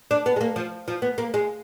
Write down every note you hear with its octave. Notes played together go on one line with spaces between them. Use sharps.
D4
B3
G#3
A#3
F3
F3
B3
A#3
G#3